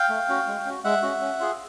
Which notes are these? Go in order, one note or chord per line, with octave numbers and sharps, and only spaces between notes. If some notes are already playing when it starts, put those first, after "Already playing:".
Already playing: F5 G5
A3
C#4 F#4
G#3
C#4 F#4
G#3 E5 F#5
C#4 F#4
C#4
F4 G#4